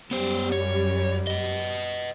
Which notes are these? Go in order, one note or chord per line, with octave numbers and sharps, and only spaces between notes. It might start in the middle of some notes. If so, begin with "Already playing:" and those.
F#2 G3 B3 C5
C#5
B4 D#5